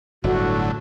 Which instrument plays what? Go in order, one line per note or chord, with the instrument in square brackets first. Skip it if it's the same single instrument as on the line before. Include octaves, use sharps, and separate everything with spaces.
[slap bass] G1 [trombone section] A2 [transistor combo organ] D3 F#3 A3 [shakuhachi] F#4